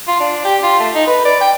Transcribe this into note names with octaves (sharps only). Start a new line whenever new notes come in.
F4
D4
G4
F4
A3
D#4
B4
D5
G5